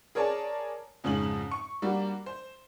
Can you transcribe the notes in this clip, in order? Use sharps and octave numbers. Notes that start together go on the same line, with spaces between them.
G#4 A#4 C#5 D5 A5
F2 G#2 C#3 C#4 F#7
C#6
G3 A#3 D4 F#4
C5